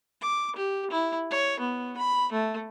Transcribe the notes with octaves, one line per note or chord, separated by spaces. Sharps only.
D6
G4
E4
C#5
B3
B5
A3